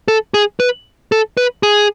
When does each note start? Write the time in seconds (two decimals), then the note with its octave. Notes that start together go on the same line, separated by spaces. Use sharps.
0.08 A4
0.34 G#4
0.60 B4
1.12 A4
1.37 B4
1.63 G#4